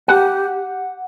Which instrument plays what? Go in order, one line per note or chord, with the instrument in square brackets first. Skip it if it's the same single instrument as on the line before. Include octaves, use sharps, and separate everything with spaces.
[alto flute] G4 [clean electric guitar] F#5